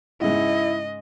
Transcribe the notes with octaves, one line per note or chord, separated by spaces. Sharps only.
G#2 C#3 G#3 E4 D#5